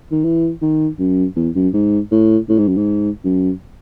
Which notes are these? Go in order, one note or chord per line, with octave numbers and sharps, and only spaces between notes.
D#3
E3
D#3
F#2
E2
F#2
G#2
A2
A2
G#2
F#2
G#2
F#2